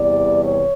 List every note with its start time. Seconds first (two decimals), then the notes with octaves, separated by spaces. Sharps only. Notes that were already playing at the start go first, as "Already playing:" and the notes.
Already playing: E2 C3 E3 G3 D5
0.44 C#5